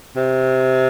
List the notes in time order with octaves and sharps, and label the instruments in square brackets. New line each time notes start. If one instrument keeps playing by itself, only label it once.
[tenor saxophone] C3